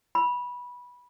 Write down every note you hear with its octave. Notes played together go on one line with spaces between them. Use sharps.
B5